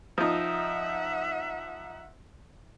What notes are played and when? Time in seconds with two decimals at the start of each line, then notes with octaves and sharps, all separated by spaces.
0.18 F3 D#4 E5 F#5